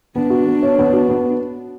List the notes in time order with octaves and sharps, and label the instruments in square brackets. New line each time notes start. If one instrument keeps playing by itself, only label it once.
[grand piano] B3 [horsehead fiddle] D4
[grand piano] F#4
B3
C#5
B3
F#4
B3